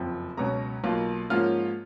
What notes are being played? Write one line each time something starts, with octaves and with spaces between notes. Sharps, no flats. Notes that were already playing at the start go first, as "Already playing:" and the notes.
Already playing: F#1 F2 F3
C#2 B2 F#3 C#4 A#5
B1 B2 A#3 F4
G#2 F3 A#3 C#4 F4 F6